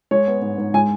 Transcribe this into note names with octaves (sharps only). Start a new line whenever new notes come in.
G#3 C#5
B3
G#2
G#2
G#3 G#5